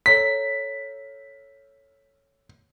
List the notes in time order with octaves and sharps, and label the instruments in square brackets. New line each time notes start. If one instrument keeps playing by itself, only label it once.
[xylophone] A4 C#5 A#5 [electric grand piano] B6